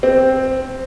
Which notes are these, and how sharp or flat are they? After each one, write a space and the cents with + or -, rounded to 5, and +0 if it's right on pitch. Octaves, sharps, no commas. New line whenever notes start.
C4 +0